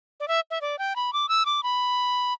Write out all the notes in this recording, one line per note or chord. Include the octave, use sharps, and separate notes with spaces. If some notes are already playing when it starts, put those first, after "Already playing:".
D5
E5
E5
D5
G5
B5
D6
E6
D6
B5